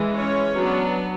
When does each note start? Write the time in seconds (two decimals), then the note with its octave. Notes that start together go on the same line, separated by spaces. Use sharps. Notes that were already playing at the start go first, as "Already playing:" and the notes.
Already playing: E3 G#3
0.14 C#4 C#5
0.54 F#3 B3 D4